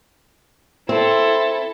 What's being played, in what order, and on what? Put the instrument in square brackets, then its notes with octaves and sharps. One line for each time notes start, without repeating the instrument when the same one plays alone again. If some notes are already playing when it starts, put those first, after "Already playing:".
[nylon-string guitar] C4 [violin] E4 A4